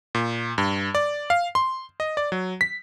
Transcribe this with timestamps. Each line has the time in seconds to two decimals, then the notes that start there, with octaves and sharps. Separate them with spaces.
0.15 A#2
0.58 G2
0.95 D5
1.30 F5
1.55 C6
2.00 D#5
2.17 D5
2.32 F#3
2.61 B6